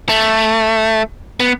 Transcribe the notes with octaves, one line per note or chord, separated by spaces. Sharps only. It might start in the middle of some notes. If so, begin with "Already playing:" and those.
A3
B3